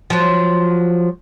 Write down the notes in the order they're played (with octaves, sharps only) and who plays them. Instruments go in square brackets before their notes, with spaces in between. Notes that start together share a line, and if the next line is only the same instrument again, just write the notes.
[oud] F3 F#3